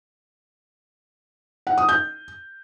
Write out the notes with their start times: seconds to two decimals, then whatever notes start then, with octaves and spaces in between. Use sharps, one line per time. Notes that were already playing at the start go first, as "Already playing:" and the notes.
1.67 F#5
1.78 D#6
1.89 G6